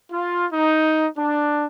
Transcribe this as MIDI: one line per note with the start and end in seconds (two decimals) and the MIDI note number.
0.11 0.46 65
0.52 1.06 63
1.17 1.65 62